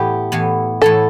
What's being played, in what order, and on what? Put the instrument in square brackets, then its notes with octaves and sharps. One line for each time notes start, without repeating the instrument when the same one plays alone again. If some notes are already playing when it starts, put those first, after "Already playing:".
Already playing: [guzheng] A2 E3 B3 [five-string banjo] G4
[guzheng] A2 E3 B3
[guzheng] A2 E3 B3 [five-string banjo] A4